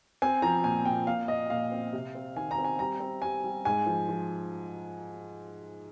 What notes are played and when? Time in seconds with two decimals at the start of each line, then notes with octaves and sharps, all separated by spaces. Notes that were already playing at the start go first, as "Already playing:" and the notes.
0.22 C4 G#5
0.42 F3 A#5
0.64 A#2 G#5
0.85 A#2 G5
1.07 A#2 F5
1.28 A#2 D#5
1.50 A#2 F5
1.72 C4
1.93 C3
2.15 C4
2.36 D#3 G#5
2.51 A#5
2.58 C4
2.65 G#5
2.79 G3 A#5
3.00 C4
3.22 G3 G#5
3.44 G3
3.65 G#2 G#5
3.86 F3
4.09 F3